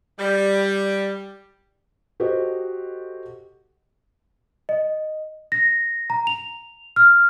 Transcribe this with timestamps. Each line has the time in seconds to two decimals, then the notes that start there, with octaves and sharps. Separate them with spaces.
0.18 G3
2.20 F#4 G4 A4 C5 D#5
4.69 D#5
5.52 A#6
6.10 A#5
6.27 F7
6.96 F6